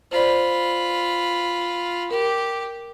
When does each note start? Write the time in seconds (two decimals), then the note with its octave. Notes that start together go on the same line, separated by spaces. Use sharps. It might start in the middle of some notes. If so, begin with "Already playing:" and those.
0.11 F4 C5 D5 B5
2.11 G4 A#4